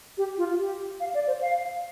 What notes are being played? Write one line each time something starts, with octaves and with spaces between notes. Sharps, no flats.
G4
F4
G4
F5
D5
C5
F5